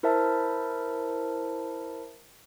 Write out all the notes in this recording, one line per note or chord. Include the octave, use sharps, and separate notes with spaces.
E4 A#4 C5 E5 A5